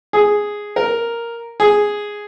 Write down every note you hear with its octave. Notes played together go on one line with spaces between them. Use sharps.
G#4
A#4
G#4